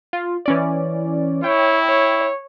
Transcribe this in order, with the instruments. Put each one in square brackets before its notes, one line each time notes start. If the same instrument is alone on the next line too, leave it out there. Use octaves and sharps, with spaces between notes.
[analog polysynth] F4
E3 C#4 D5
[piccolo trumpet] E4 [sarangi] C#5 [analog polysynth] G5
[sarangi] C#5